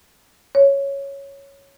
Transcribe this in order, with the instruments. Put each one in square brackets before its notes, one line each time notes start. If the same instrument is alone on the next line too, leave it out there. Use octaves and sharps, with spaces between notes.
[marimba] C#5